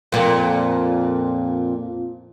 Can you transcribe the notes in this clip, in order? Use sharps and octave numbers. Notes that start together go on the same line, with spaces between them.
F2 A#2